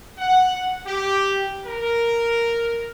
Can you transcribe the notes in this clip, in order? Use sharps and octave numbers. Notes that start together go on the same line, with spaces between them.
F#5
G4
A#4